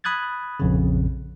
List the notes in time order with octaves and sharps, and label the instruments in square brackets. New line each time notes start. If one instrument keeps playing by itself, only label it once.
[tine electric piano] B5 D#6 F#6 G#6 A6
A#1 F2 C#3